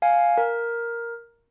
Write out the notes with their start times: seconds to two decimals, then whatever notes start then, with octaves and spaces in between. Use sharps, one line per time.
0.02 F5 G#5
0.38 A#4